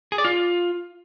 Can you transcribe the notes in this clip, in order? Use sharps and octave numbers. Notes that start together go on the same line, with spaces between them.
G#4
D5
F4